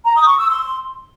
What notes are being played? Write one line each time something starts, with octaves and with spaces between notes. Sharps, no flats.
A#5
D#6
C#6
E6
C6